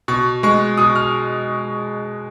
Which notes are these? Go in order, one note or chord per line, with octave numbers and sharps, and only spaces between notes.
B2 C#6
G#3 C#6
B2 D#6
F6